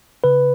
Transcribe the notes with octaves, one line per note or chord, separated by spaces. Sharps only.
C#3 B4